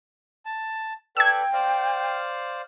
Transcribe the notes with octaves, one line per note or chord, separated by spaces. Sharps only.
A5
A4 B4 D5 G5 E6 G#6
C5 D5 F5